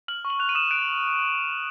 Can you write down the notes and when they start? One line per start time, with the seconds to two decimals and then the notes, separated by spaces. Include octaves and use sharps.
0.08 F6 F#7
0.25 C#6
0.30 F#7
0.39 F#6 F7
0.49 D#7
0.55 D#6 E7
0.71 F#6 D7